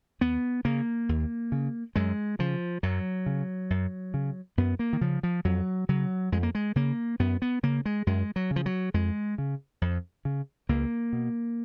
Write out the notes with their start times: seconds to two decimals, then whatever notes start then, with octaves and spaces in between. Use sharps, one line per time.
0.21 D#2 B3
0.65 C#3 A#3
1.09 D#2
1.52 C#3
1.96 F#2 G#3
2.39 C#3 F3
2.83 F#2 F#3
3.26 C#3
3.70 F#2
4.14 C#3
4.57 F#2 B3
4.79 A#3
4.93 D#3
5.01 C#3 F3
5.23 F3
5.45 F2 F#3
5.89 C#3 F#3
6.32 F2 G#3
6.43 A#3
6.55 G#3
6.76 C#3 A#3
7.19 F#2 B3
7.42 B3
7.63 C#3 A#3
7.86 G#3
8.07 F#2 G#3
8.36 F#3
8.51 C#3
8.56 F3
8.66 F#3
8.94 F2 G#3
9.38 C#3
9.82 F2
10.25 C#3
10.69 C#2 A#3
11.13 B2